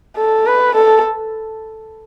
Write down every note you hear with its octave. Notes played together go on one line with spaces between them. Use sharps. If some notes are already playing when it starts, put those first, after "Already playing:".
A4
B4
A4